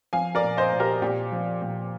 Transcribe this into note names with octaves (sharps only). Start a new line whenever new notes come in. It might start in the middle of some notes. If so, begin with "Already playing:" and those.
F3 F5 G#5
A#4 D5
A#2
C5 D#5
A#2
G4 A#4
A#2 G4
F3
A#2